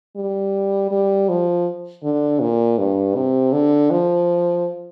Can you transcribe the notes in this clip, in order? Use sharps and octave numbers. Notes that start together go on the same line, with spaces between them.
G3
G3
F3
D3
A#2
G2
C3
D3
F3